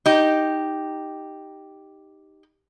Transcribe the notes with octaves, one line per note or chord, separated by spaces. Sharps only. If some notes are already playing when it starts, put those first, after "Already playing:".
D#4 G4